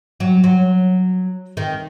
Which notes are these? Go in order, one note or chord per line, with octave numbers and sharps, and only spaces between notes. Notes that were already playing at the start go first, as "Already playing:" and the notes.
F#3
F#3
D#3